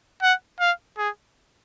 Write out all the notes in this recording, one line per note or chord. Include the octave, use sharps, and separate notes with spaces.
F#5
F5
G#4